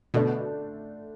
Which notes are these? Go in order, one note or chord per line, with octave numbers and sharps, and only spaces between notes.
B2 D3 A3 D4